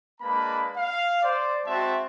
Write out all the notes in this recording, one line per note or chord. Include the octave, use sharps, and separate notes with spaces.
G#3 A#3 D4 B4 A5 B5
F5
C5 D5
G#3 C4 F#4 E5 A5 C6